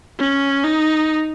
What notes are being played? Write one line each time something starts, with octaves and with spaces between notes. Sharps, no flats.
C#4
D#4